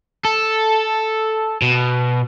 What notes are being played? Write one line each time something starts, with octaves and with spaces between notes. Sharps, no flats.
A4
B2